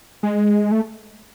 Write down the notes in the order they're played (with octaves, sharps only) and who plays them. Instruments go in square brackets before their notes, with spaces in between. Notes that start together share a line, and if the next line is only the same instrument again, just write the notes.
[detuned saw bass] G#3
A3